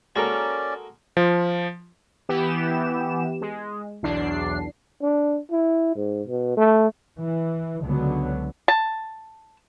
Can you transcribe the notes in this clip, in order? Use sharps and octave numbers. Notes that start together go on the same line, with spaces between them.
G#3 A#3 C#4 F#4 A4 A#4 D5
F3
E3 B3 G4 E7
G#3
B1 E2 D4 C7
D4
E4
G#2
B2
A3
E3
C#2 D3 F#3 B3
A5